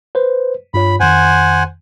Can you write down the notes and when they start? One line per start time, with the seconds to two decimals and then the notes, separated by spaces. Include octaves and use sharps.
0.15 B4 C5
0.74 G2 F4 C#5 B5
1.00 F2 D#3 C5 F#5 G#5